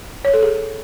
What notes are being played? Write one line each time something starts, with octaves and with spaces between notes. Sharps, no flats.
C#5
A4
G#4